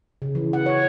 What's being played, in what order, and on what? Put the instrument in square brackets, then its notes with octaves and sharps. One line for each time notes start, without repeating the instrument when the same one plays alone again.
[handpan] C#3
E3
F#5
C#5